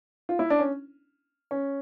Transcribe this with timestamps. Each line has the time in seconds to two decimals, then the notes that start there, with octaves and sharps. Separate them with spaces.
0.29 F4
0.39 E4
0.50 D4
0.59 C#4
1.51 C#4